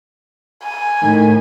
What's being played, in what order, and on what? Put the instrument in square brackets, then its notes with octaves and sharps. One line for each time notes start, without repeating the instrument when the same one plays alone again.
[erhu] G#5
[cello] A2 [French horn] D#3